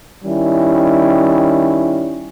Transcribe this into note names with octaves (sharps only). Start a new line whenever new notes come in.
D#3 G3 C#4 E4